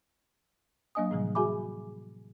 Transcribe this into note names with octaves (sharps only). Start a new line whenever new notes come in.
F#3 A#3 D4 D#5 G#5 D#6
A2 C3 E3 F3 G3
F#4 G#4 E5 G#5 B5 D6